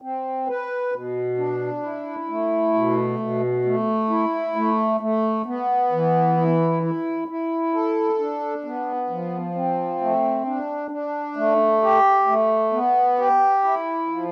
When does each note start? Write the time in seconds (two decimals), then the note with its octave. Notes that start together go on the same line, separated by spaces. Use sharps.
0.02 C4
0.48 B4
0.92 B2
1.37 D4
1.83 E4
2.29 A3
2.74 B2
3.19 B2
3.65 A3
4.10 E4
4.56 A3
5.00 A3
5.46 B3
5.92 E3
6.37 E4
6.83 E4
7.28 E4
7.73 A4
8.19 D4
8.64 B3
9.10 F3
9.55 C4
10.01 A3
10.45 D4
10.91 D4
11.36 A3
11.82 G4
12.27 A3
12.72 B3
13.19 G4
13.64 E4
14.08 F3